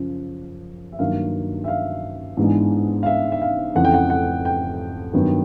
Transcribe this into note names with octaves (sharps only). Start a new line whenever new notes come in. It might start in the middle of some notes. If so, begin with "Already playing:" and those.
Already playing: F#2 C#3 F3
E5
G2 D#3 F#3 A#3 F5
E5
F5
G#2 E3 G#3 B3 D4
F5
E5
E5
F5
F2 C#3 E3 A3 F#5
G5
F#5
F#5
G5
G2 D#3 F#3 B3